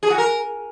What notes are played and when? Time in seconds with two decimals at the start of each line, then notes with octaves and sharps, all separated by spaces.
0.03 G#4
0.10 F#4
0.18 A#4